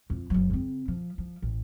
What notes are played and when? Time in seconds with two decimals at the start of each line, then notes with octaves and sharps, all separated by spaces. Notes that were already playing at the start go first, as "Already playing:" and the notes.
0.10 F2
0.30 F#1 F#3
0.50 C#3 C4
0.88 F3
1.18 F3
1.42 A1